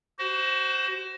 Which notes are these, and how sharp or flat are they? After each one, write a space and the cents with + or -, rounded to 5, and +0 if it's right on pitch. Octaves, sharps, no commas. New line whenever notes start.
F#4 +35 C5 +0